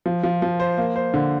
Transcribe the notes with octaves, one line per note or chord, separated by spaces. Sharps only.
F3
F3
F3
C5
A#3
C5
D3